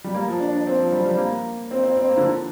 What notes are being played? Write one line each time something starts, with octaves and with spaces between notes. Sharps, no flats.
G3
A#3
F3
D4
D4
C4
F3
G3
G3
A#3
C4
C4
C4
A#3
D3
F3